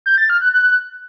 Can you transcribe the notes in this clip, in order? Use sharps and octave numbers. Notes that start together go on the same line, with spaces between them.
G6
A6
F6
F#6
F#6